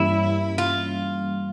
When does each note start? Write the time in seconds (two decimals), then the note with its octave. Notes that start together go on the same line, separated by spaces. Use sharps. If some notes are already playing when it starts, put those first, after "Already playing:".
Already playing: G2 E3 G3 A#3 C#4 E4
0.58 F4